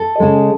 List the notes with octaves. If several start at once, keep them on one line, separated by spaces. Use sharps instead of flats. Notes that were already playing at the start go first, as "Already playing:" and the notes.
Already playing: A4
C#3 G#3